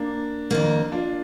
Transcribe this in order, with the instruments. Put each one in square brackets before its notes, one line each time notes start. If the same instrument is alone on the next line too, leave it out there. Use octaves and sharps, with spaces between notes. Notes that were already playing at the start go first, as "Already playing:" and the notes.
Already playing: [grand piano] A#3 D4
[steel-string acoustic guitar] F2 D#3 A#3
[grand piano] D4 F4